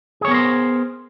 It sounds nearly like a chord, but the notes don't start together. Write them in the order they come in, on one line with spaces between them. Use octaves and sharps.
G#4 C#5 B3 A#4 C5